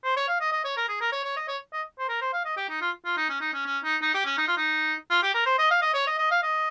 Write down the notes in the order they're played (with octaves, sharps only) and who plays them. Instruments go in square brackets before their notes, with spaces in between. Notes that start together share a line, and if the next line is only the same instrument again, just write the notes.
[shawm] C5
C#5
F5
D#5
D#5
C#5
A#4
G#4
A#4
C#5
C#5
D#5
C#5
D#5
C5
A#4
C5
F5
D#5
G4
D#4
F4
F4
D#4
C#4
D#4
C#4
C#4
D#4
D#4
G4
C#4
D#4
F4
D#4
F4
G4
A#4
C5
D#5
F5
D#5
C#5
D#5
D#5
F5
D#5